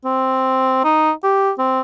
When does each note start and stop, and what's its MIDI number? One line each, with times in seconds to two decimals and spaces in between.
0.05 0.81 60
0.84 1.11 63
1.23 1.51 67
1.58 1.81 60